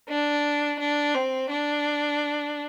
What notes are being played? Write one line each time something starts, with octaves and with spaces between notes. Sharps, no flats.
D4
D4
C4
D4